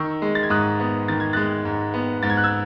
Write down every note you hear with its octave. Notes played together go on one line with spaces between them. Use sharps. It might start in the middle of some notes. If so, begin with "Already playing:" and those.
Already playing: D#3 C#6 E6
G#3
A6
G#6
G#2 D#6 F#6
B3
D#3 A6
G#6
G#3 F#6 A6
G#2
B3
G#2 A6
G#6
F#6
E6 G#6